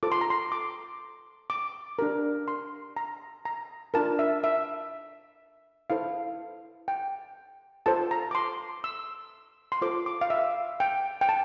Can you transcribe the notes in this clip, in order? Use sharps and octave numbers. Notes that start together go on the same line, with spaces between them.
F4 A4 C5 D6
C6
A#5
C6
D6
D6
D4 G4 A#4
C6
A#5
A#5
D4 F4 A#4 A5
E5
E5
E4 A4 C5 F5
G5
F4 A4 C5 A5
A#5
D6
C6
E6
C6
F4 A4 C5 D6
D6
F5
E5
G5
G5
A5